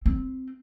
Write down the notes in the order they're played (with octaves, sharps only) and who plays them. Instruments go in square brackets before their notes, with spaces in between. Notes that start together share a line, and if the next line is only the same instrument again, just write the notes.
[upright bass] C4